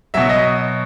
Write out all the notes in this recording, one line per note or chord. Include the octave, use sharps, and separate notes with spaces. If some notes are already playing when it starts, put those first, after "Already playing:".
B2 F#3 E5
D#5